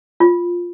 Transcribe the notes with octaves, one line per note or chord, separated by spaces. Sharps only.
F4